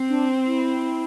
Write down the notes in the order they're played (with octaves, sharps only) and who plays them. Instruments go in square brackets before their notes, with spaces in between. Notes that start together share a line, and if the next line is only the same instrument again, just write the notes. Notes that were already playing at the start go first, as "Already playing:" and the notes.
Already playing: [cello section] C4
[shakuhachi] D4
E4